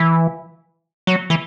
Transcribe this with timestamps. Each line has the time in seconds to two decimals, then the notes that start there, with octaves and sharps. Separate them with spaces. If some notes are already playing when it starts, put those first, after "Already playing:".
Already playing: E3
1.07 F#3
1.30 E3